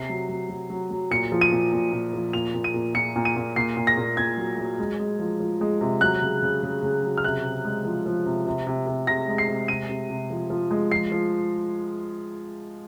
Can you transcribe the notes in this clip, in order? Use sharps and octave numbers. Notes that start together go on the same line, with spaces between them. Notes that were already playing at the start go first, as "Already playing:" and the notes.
Already playing: C3 C7
F#3
F#3
F#3
F#3
F#3
A#2 C#7
F3
D#7
A#2
A#2
A#2
F3
A#2 F7
A#2
D#7
A#2
A#2 C#7
A#2
D#7
A#2
A#2 C7
A#2
A#6
A#2
A#2 G#6
F#3
F#3
G#3
G#3
F3
F3
G#3
C3
F#3 F#6
C#3
C#3
C#3
C#3
F#3
F6
C3 F#6
C3
G#3
F3
F3
C3
C3
C3
C3
C3 A#6
G#3
C7
C3
C3 D#7
C3
C3
F3
F3
G#3
F3 C7
F3